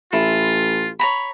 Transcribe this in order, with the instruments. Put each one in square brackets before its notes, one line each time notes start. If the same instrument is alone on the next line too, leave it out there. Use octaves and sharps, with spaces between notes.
[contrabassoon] A1 [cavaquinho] E4 [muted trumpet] F4
[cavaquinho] C#5 A#5 B5